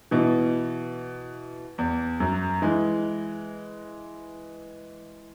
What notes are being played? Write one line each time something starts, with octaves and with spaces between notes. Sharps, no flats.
B2 E3
E2
F#2
E3 G#3